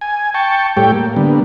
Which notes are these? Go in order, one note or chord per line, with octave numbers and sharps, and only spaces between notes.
G#5
G5 A5 C#6
A2 G3 G4 A4 C#5 G5
A#3
D3 G3 A#3 B3